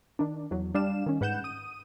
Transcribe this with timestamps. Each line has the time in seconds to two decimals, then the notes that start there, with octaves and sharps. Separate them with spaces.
0.19 D#3 D4
0.51 E2 F#3
0.75 G3 D4 F5 E7
1.06 D#3 C#4
1.21 G#2 B4 F#5 G6 E7
1.44 D#6 D#7